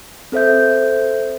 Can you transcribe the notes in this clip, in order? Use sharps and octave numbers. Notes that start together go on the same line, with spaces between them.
C4 A4 C5 E5 G6